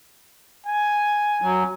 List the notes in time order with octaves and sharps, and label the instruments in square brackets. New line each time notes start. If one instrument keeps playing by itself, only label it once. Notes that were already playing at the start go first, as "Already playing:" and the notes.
[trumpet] G#5
[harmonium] F#3